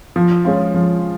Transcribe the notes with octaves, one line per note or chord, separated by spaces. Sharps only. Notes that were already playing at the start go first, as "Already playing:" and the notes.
F3
G#3 C#4 F4
F3